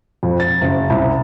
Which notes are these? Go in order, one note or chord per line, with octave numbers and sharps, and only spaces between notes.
F2
A6
F#1
C2